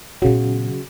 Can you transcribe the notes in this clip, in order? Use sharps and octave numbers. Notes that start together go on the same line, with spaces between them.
A#2 C#3 F#3 B3